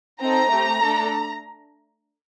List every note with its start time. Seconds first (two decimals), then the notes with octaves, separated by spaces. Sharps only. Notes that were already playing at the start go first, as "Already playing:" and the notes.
0.21 C4 D#4 A4 A#5
0.51 A3 C4 G4
0.81 A3 D4 A4